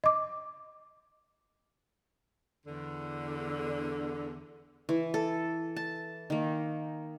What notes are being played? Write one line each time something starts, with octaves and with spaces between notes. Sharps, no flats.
D#5 D6
E2 D3
E3
A4
A5
D#3 A#3